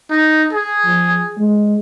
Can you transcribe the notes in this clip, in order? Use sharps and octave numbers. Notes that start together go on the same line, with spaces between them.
D#4
G#4
F3
G#3